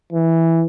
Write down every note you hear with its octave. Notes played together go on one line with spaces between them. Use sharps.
E3